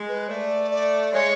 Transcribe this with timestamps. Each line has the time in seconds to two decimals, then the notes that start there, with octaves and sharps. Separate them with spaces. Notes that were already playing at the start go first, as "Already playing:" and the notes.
Already playing: G#3
0.08 B4
0.29 A3 D5
0.71 D5
1.13 G#3 C#5